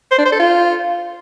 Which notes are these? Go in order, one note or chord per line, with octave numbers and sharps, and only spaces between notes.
C5
D4
C5
A4
F4